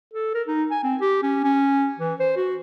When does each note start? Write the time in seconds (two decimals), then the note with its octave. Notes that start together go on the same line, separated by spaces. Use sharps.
0.14 A4
0.35 A#4
0.48 D#4
0.71 G#5
0.83 C4
1.01 G4
1.23 C#4
1.44 C#4
1.99 E3
2.20 C5
2.37 F#4